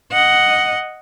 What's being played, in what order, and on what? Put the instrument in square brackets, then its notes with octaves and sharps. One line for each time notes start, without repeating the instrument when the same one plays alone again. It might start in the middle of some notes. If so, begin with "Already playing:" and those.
[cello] D#5 F#5